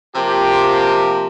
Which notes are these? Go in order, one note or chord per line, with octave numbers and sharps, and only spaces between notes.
C3 F3 A#3 G4